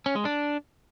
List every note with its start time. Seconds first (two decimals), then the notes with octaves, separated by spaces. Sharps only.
0.06 C#4
0.16 G#3
0.25 D4